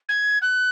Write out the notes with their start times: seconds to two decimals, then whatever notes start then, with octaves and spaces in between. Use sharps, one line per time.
0.09 G#6
0.42 F#6